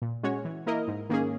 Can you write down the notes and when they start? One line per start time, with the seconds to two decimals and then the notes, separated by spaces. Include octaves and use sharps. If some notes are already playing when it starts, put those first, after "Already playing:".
0.02 A#2
0.23 G#3 C#4 F#4 C#5
0.45 E3
0.66 A#3 E4 A#4 D#5
0.88 G#2
1.09 D#3 A#3 C#4 G#4